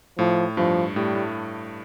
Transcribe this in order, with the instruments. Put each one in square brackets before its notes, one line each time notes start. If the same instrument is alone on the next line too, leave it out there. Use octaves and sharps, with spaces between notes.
[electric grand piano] A2 [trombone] F3
[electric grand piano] G2 [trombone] F3
[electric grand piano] A2 [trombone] G3
[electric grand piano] A2